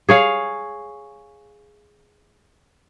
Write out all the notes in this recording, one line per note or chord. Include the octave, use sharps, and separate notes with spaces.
G#4 C#5 F5